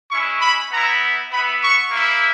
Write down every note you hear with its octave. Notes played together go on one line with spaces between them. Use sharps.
G#3 C#4 E4 C#6
B5
B3 E4 A#5
B3 E4 B5
C#6
A#3 E4